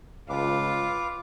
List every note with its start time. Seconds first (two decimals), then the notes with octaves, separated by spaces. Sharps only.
0.29 C#2 F4 B4 D6